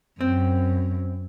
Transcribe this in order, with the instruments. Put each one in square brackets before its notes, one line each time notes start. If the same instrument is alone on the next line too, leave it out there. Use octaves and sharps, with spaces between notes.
[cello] F#2 [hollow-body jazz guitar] C4